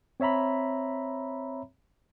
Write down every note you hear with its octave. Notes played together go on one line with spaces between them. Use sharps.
C4 C#5 E5 A#5 B5